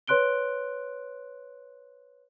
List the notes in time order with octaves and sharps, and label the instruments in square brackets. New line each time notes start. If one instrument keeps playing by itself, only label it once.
[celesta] B4 C#5 C6 F#6 D7 G7